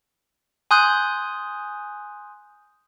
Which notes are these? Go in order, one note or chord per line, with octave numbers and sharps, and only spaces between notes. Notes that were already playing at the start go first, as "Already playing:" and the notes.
G#5 C6 D#6 F#6 G6